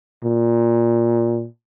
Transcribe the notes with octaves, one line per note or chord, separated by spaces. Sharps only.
A#2